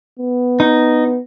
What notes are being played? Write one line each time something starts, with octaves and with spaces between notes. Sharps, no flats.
B3
D#4